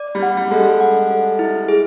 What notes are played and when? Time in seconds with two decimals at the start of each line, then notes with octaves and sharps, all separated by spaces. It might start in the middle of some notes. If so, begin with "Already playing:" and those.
Already playing: D5
0.15 G3
0.23 F#5
0.37 G3
0.51 G#3 A4
0.59 G3
0.81 F#5
1.10 A4
1.39 E4
1.68 G#4